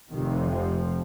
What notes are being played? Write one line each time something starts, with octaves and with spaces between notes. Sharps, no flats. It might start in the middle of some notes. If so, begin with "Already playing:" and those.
F1 F2 C3 D#3
F3